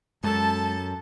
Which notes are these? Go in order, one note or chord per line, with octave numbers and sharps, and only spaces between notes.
F#2 G#3 A4 A5